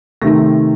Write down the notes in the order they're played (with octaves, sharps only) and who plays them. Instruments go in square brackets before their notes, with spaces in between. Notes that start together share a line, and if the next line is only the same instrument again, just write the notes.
[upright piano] C3 D#3 A3 A#6